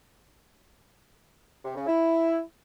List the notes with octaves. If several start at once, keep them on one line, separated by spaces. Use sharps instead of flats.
C3
C#3
E4